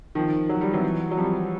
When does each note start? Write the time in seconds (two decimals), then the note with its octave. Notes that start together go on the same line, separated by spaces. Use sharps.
0.15 D#3 F3
0.49 F#3
0.61 G3
0.73 E3 F#3
1.11 F#3
1.17 F3 G3